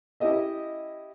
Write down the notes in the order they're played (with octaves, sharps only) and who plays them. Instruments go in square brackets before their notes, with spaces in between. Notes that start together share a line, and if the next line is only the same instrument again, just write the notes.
[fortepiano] C#4 E4 G4 D#5 E5